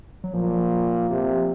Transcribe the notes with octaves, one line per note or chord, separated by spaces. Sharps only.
F#3
A#2 F3
C3